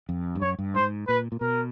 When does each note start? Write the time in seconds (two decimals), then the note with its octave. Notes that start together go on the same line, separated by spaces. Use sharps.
0.09 F2
0.35 G2
0.41 F#2 C#5
0.59 G2
0.75 G#2 C5
1.08 A#2 B4
1.32 A#2
1.41 B2 A#4